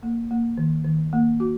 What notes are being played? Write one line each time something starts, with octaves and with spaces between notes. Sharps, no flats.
A#3
A#3
D#3
D#3
A#3
F#4